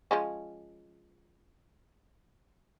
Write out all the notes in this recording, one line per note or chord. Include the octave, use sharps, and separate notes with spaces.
F3 G#3 C#4